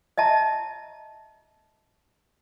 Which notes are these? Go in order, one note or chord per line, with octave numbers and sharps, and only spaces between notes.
D#5 E5 A5 A#5